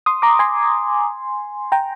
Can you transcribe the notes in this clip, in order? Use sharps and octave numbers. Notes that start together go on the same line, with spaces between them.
C6 D#6
A#5 D6
G#5 C6
G5 A#5